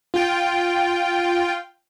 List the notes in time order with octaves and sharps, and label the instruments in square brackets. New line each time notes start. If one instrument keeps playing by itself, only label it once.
[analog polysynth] F4 G5